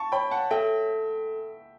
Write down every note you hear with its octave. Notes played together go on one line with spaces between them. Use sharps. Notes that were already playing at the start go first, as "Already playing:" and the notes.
Already playing: A5 C#6
C#5 G5 B5
F#5 A5
A4 E5 G5